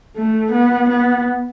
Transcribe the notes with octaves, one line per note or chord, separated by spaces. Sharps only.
A3
B3
B3